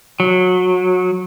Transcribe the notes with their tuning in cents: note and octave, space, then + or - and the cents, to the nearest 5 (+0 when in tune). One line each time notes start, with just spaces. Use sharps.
F#3 -20